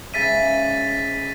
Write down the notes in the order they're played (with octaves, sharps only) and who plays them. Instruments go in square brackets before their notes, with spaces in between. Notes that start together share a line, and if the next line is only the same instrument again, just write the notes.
[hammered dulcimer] G#2 C#3 E5 [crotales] A6 B6 D#7